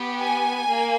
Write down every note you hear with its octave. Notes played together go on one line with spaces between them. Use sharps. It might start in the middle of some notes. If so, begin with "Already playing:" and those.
Already playing: B3 G4
G#5
A#3